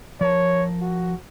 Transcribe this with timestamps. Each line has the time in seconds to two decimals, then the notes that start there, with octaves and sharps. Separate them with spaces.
0.21 F3 A#4 C#5 A5
0.81 F#4